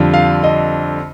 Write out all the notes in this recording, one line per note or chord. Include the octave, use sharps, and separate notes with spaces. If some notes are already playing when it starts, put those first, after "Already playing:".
Already playing: F2 D3 G3 D4 F4
F5
D#5